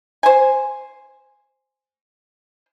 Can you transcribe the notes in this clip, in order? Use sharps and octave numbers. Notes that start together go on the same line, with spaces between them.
C5 G#5